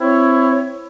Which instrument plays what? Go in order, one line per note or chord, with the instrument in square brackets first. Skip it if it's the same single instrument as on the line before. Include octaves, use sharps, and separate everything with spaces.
[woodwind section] C4 E4 C#5